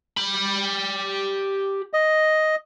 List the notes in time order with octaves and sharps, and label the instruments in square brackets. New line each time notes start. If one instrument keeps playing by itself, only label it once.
[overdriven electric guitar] G4 B5
[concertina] D#5